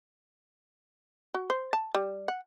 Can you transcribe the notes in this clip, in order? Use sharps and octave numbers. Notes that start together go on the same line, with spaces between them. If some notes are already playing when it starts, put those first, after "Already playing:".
F#4
C5
A5
G3
F#5